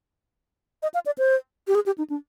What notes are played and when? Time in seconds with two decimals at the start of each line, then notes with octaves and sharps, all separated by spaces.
0.83 D#5
0.94 F5
1.06 D5
1.18 C5
1.67 G4
1.75 G#4
1.86 G4
1.98 D#4
2.10 D4